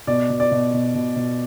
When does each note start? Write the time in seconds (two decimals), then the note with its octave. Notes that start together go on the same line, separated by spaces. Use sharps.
0.07 B2 D5
0.30 B2
0.40 D5
0.51 B2
0.73 B2
0.95 B2
1.16 B2